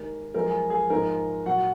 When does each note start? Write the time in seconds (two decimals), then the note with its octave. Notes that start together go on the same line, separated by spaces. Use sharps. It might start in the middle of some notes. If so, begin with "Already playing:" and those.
Already playing: D#2 D#3 G#3 A#4
0.34 F#2 F3 G#3 A#4
0.46 G#4
0.70 G#4
0.90 G#2 F3 G#3 A#4
1.46 A#2 F#3 F#4 F#5